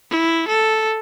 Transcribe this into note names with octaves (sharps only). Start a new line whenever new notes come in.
E4
A4